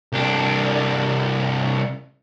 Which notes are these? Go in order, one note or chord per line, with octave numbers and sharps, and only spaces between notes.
C2 D4